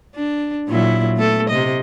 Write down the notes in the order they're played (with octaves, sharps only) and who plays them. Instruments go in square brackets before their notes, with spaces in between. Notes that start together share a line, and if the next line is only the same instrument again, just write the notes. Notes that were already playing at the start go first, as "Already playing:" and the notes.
[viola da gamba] D4
A#2 F#3 E4
A3 B3 A4
C3 D#5